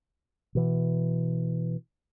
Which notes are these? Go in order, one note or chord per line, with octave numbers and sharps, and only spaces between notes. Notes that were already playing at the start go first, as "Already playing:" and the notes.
B2 E3